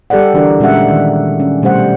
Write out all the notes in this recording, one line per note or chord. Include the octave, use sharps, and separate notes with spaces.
G3 G4 A4 B4 D5 F#5
D3 E3 D4 F#4 A#4
A#2 G#3 C#4 F#4 E5 F#5
D#3
C#4
B2 G3 A3 C5 F#5